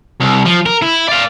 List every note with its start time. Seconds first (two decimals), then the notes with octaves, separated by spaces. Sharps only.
0.21 C2
0.46 F3
0.66 A#4
0.82 E4
1.08 D5 F5